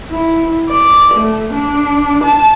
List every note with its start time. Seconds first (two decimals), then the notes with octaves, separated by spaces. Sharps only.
0.11 E4
0.69 D5
1.14 A3
1.53 D4
2.24 A5